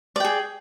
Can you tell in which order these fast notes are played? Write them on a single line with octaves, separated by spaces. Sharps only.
D5 G5 G#4